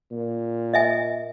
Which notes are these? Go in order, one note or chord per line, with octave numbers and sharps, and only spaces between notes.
A#2
D#5 E5 G#5